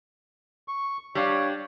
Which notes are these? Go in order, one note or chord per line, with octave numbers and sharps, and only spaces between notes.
C#6
G3 D4 C#5 F5